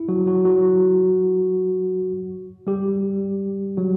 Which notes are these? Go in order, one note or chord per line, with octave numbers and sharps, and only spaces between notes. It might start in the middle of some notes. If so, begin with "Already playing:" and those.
Already playing: E4
F#3 F#4
F#3 F#4
F#3 F#4
G3 G4
F#3 F#4